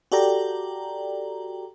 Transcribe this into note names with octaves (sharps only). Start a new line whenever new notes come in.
F#4 G4 A4 D5 G5 A#5